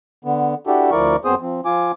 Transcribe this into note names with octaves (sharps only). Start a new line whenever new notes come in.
D3 B3
D4 E4 F#4 G4 A4
D2 F3 E4 A#4 D5 C#6
F#2 B3 C4 G#4 C5 D#6
F3 C4
F3 F4 G#5 D6